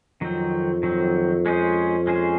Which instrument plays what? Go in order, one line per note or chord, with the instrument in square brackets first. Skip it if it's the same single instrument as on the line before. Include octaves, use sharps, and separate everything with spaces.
[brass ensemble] F2 [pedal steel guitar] D#3 F#3 C4
[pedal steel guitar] D#3 F#3 C4
G#3 C#4 G#4 C5
G#3 C#4 G#4 C5